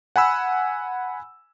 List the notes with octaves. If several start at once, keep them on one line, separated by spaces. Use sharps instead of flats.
F#5 G#5 B5 E6